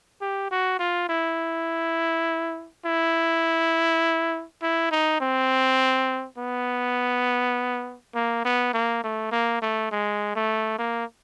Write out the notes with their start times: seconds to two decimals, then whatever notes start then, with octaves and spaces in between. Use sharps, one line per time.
0.21 G4
0.51 F#4
0.79 F4
1.09 E4
2.86 E4
4.62 E4
4.91 D#4
5.20 C4
6.38 B3
8.15 A#3
8.45 B3
8.74 A#3
9.04 A3
9.32 A#3
9.62 A3
9.91 G#3
10.36 A3
10.79 A#3